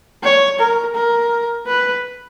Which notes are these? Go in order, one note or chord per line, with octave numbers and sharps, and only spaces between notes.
C#5
A#4
A#4
B4